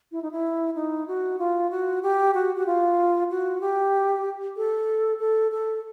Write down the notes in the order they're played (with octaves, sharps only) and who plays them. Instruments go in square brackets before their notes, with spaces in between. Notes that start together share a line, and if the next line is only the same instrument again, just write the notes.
[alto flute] E4
D#4
E4
D#4
F#4
F4
F#4
G4
F#4
F#4
F4
F#4
G4
A4
A4
A4